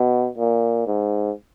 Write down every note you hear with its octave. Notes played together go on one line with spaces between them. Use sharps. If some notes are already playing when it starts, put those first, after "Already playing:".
Already playing: B2
A#2
G#2